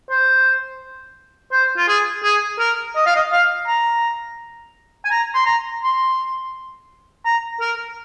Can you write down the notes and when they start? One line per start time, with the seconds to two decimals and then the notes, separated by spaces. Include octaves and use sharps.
0.10 C5
1.52 C5
1.77 F4
1.88 G#4
2.24 G#4
2.59 A#4
2.96 D#5
3.06 F5
3.15 D#5
3.32 F5
3.67 A#5
5.05 G#5
5.11 A#5
5.34 C6
5.46 A#5
5.82 C6
7.25 A#5
7.61 A#4